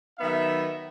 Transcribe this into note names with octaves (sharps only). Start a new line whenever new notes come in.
D#3 F#3 B3 D#4 E5